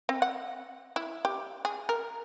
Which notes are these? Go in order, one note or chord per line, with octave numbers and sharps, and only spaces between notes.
C4
F#5
E4
G4
G#4
A#4